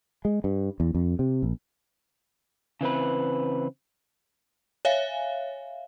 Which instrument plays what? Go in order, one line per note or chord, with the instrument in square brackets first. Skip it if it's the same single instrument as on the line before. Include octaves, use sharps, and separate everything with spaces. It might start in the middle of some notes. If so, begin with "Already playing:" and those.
[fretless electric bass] G#3
G2
E2
F2
C3
A#1
[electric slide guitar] C#3 E3 C4 B4
[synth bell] C#5 E5 F5 G#5